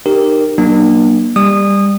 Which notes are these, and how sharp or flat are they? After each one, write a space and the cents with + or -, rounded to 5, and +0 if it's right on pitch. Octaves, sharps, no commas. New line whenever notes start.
D#4 -30 G4 +0 A#4 +0
F#3 +20 A#3 +30 D4 +45
G3 +20 D#6 -20